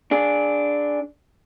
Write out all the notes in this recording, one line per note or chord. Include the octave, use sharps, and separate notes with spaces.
D4 G#4